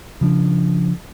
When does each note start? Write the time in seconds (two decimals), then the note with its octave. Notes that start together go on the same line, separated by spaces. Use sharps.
0.21 C#3 F3 D4